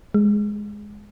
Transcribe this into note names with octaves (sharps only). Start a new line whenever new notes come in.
G#3